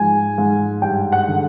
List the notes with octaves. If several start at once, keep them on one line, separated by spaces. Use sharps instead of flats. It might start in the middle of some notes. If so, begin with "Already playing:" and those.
Already playing: G#2 F3 G#5
G#2
G2 G5
F#5
D3